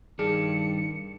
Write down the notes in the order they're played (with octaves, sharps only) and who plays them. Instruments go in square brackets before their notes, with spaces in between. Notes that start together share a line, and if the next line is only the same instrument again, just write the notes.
[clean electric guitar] G2 D4 [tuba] D#3 [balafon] G#4 [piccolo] C#7